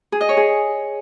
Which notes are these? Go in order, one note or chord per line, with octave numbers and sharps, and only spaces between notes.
G#4
D#5
C#5
G#4